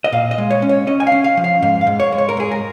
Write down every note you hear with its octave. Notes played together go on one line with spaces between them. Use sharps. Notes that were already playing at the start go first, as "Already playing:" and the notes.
D#5
A#2 F5
D#5
G#3
C#5
C#4
C#5
C#4 D#5
G#5
F5
C#4
F5
F3
F5
G#2 F5
F5
G#2
C#5
G#3
C#5
A#4
G#2 G#4
A#4